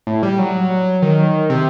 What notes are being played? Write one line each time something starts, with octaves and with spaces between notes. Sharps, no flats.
A2
G3
F#3
D#3
C3